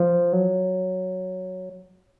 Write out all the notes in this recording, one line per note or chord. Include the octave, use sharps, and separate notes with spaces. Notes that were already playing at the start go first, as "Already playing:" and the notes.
Already playing: F3
F#3